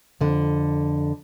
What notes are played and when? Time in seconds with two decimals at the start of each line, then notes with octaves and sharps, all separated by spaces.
0.21 F2 D3